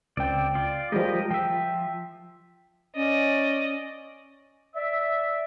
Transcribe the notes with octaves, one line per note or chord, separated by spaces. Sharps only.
C#2 C4 D5 G5
F4 D5
F3 G3 G#3 G4 A#4 D#5
F3 E5 G5
C#4 D5 D#5
D5 E5